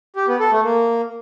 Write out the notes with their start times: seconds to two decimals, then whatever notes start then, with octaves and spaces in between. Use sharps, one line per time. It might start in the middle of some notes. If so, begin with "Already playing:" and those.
0.16 G4
0.28 B3
0.40 A4
0.52 A3
0.63 A#3